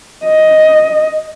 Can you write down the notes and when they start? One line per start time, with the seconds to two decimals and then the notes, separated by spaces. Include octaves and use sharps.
0.25 D#5